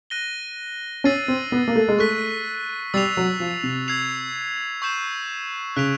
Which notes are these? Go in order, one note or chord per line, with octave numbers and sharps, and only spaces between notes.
F#6 A#6 D#7 G7
C#4 E6 A6 C7 D#7
C4
B3
A#3
A3
G#3
A3 C#6 F#6 B6
G3 E6 A6 C7 F7
F#3
F3
C3
E6 G#6 C7 F7
C#6 E6 G6 C7 E7
C#3 F#6 B6 D7 F7